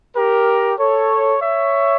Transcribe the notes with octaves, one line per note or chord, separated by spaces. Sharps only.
G4 A#4
A4 C#5
C#5 E5